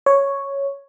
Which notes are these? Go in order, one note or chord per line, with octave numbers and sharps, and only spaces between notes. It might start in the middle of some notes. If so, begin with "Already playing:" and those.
C#5